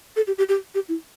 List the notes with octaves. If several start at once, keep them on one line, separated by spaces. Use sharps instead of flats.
A4
G4
G4
G4
G4
E4